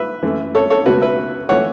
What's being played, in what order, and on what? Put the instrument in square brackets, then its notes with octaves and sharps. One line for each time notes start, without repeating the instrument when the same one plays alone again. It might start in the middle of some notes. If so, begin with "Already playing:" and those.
Already playing: [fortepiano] B4 E5
F#2 E3 A3
A4 C#5
A4 C#5
C#2 B2 A3 F#4 B4
B4 E5
E3 A3 C#5 F#5